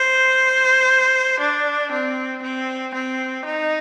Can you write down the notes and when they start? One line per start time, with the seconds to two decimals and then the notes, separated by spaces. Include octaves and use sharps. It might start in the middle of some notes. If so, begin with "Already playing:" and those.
Already playing: C5
1.40 D4
1.92 C4
2.42 C4
2.94 C4
3.45 D#4